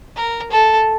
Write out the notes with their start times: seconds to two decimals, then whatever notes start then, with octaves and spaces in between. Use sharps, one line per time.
0.16 A#4
0.51 A4